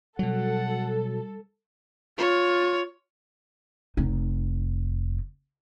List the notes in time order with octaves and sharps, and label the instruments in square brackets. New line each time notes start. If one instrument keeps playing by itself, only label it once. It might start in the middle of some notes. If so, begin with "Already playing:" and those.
[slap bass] B2 F#3 [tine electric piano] G3 [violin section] A4 [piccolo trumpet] F#5
[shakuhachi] F4 [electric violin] C#5
[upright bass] F1 D#4